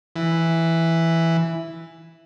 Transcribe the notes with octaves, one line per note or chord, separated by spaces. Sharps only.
E3